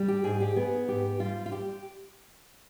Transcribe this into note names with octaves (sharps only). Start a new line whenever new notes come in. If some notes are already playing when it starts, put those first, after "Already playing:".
Already playing: G3
G4
G#2 G#4
G4
B3 G#4
G#2 G4
G3 F4
F4
G4